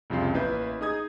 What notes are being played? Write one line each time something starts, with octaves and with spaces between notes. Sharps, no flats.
C2 F2 C#3 F4 C7
A1 A#3 E4 B4 G6
D#4 G#4 D#6 G#6